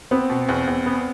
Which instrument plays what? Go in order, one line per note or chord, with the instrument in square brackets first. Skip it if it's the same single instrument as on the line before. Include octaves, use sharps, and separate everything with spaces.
[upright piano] B3 [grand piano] C4
[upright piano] B2
E2
E2
B3